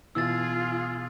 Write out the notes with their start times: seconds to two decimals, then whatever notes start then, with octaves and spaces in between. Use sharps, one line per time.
0.15 B2 E3 F4 G#4 E6 A6